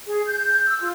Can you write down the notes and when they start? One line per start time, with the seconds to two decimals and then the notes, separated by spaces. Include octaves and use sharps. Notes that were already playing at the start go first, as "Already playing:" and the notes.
0.07 G#4
0.27 G6
0.67 E6
0.81 F4